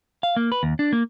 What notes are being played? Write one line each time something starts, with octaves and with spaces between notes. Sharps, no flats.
F5
A#3
B4
D#2
D4
A#3